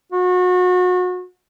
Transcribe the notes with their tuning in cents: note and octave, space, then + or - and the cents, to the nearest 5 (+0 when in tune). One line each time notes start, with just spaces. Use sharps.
F#4 -30